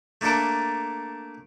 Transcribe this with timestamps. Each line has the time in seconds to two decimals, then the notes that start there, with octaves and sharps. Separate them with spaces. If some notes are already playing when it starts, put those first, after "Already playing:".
0.21 A3 A#3 D4 A4 A#4